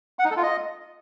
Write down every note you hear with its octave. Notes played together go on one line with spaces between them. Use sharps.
F#5
D#4
A4
F4
D#5